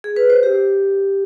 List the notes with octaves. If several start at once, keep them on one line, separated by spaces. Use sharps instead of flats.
G#4
B4
C5
G4